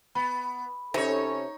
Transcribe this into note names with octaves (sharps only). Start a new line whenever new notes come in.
B3 B5
C3 C#4 D#4 A4 C#5